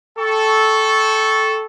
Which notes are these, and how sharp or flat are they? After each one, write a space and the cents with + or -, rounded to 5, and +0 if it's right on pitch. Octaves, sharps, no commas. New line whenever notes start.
A4 -10 G5 +0 C#6 +0